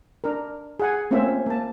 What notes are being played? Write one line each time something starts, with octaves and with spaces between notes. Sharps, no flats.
D4 A#4
G#4 F#5 G#5
A3 A#3 C4 C#4 F4 E5
A#3 A5